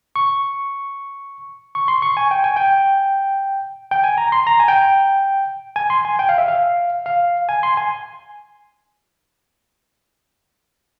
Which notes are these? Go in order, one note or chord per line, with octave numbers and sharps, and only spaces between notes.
C#6
C#6
C6
C#6
G#5
G5
G#5
G5
G5
G#5
A#5
C6
A#5
G#5
G5
G#5
C6
G#5
G5
F5
E5
F5
F5
G#5
C6
G#5